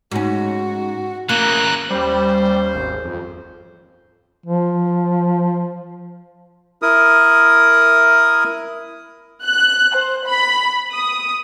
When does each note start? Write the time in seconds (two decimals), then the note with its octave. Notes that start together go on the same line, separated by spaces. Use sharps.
0.12 G#2 C#4 F#4
1.29 C#3 E3 A#3 A#5 F#6
1.90 D#2 G3 C#4 C5
2.74 G#1
3.04 F2
4.46 F3
6.82 E4 A#4 D#6
9.44 F#6
9.96 C5
10.27 B5
10.92 D#6